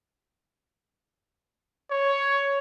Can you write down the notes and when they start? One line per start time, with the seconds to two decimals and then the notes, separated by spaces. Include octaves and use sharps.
1.91 C#5